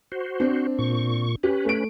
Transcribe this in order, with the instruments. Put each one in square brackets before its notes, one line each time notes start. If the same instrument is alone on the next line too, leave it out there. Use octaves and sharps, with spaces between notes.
[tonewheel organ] F#4 C5
[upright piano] C4 D4
[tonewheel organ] A#2 C#6
[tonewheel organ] C#4 B4 [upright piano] G4
[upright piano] A3 D7